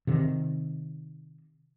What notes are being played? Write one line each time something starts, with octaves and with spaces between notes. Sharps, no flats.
C3 D#3